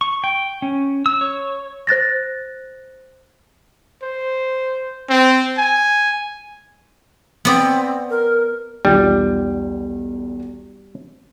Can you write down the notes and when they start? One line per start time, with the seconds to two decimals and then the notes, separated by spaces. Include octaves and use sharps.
0.01 C#6
0.24 G5
0.62 C#4
1.06 E6
1.21 C#5
1.87 C5 F#6 A6 A#6
4.03 C5
5.10 C4
5.58 G#5
7.45 B3 C4 D5
8.10 A#4
8.85 B1 E2 G3 F4